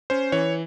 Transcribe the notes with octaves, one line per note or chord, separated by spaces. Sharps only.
C#4 C5
E3 C#5